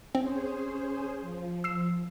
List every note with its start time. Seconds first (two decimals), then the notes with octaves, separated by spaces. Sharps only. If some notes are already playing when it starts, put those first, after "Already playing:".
0.15 C4 C#4 G#4 C5
1.21 F3
1.64 E6 C7 E7